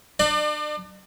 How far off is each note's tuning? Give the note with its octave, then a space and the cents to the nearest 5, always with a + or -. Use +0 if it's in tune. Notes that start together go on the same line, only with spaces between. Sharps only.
D4 +45 D5 +35